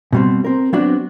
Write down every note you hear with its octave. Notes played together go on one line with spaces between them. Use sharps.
B2 G3 C4
C4 A#4
F#3 B3 C4 D4 F#4